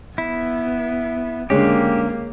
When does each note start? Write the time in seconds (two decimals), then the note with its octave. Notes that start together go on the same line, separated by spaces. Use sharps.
0.18 B3 E4
1.50 D3 G#3 A#3 C#4 G4